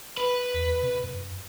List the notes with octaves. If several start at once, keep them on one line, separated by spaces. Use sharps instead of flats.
B4
E2
C3
F#2